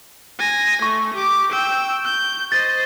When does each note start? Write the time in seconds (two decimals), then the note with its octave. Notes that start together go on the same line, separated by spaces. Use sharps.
0.39 G#5 A#6
0.82 A3 C#6
1.14 G4 D6
1.52 G5 E6
2.05 G6
2.52 C5 D#5 A6